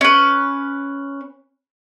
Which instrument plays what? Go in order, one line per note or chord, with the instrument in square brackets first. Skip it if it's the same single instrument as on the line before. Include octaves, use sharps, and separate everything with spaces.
[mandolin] C#4 B4